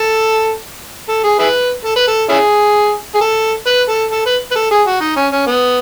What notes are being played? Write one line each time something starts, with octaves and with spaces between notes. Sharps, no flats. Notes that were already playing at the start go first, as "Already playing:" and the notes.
Already playing: A4
A4
G#4
E4 G#4 B4
A4
B4
A4
C#4 E4 G#4
G#4
A4
B4
A4
A4
B4
B4
A4
G#4
F#4
D#4
C#4
C#4
B3